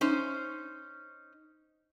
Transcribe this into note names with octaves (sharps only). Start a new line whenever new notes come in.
C#4 D#4 C5